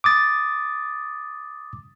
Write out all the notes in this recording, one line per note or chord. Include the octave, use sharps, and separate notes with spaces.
D6 D#6 A6